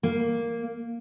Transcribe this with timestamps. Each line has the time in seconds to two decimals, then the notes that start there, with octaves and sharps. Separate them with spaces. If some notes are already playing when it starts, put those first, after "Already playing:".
0.03 A#3